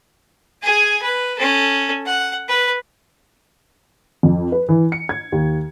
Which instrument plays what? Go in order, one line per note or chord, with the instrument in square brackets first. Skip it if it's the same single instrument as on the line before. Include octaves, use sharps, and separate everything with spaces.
[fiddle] G#4 G#5
B4
C#4 A4
F#5
B4
[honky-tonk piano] F2
B4
E3
C#7
G#6
D#2